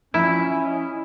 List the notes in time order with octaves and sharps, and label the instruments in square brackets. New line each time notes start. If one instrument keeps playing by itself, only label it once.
[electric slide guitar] F3 D5 G5 [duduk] C#4 [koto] E4
[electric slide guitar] D#5